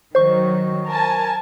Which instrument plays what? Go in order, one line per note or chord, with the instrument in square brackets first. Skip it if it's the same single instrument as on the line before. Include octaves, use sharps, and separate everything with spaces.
[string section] D#3 F#3 [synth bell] C5 C#6
[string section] A#4 G#5 A5